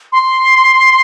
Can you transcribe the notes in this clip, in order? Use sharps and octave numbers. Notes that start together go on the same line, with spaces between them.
C6